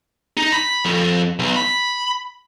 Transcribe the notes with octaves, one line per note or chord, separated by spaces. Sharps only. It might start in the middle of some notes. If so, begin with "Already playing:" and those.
D#4
B5
F2
B1
B5